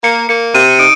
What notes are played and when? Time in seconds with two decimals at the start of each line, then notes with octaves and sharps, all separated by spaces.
0.04 A#3 C#7
0.29 A#3 C#7
0.54 C3 D#7
0.79 D#4 D7